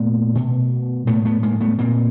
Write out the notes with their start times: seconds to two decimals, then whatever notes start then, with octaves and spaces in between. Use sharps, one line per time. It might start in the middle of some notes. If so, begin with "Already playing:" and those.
Already playing: A#2 A3 B3
0.35 B2
1.07 A2 A3 B3
1.25 A3 B3
1.43 G#3 A#3
1.61 A3 B3
1.79 A#2 A#3 C4